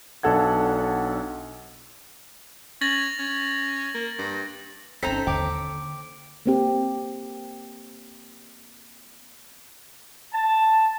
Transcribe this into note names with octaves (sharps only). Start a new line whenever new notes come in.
B1 D4 A4 F#5 G#6
C#4 A6 A#6 F#7
C#4
A#3
G2
G1 C4 C#4 D#4 A4 C5 A#5 B6
D#2 D3 G5 D6
A#3 C4 G4
A5